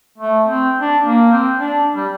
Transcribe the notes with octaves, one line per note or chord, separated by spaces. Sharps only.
A3
C4
D4
A#3
C4
D4
G3